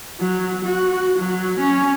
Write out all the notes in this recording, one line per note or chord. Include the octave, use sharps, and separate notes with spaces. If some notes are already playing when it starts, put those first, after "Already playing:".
F#3
F#4
F#3
C#4